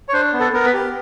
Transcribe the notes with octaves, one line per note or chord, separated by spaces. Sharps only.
C#5
D4 C5
B3
A4
B3 A#4
B4
G4